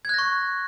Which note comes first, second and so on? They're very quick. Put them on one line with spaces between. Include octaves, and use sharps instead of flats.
G#6 F#6 A#6 C#6